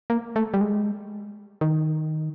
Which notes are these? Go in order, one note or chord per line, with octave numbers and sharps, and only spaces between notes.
A#3
A3
G3
G#3
D#3